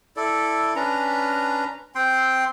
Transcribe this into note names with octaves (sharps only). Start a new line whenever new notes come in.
E4 A4 D5
C#4 D4 B4 A#5
C4 G5 C6